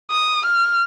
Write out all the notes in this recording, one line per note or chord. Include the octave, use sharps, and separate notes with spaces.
D#6
F6